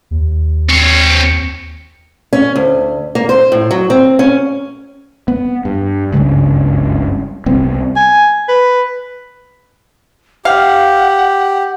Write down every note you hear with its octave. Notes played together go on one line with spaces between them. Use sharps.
D#2
C4 C#5
C#4
D2
A#3
C5
A2
F#3
C4
C#4
B3
G2
F#1 C#2 G2 C#3
C2 G3 B3 C4
G#5
B4
G4 F5 F#5